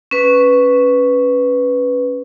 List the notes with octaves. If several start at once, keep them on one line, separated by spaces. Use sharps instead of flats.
C#4 B4